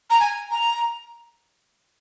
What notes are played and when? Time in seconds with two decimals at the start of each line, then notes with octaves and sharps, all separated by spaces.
0.10 A#5
0.20 G#5
0.51 A#5